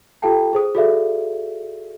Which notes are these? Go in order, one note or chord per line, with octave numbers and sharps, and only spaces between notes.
F4 G4 A4 F5 G5 A5
G#4 C5 D#6
F#4 G#4 A4 D5 E5 F5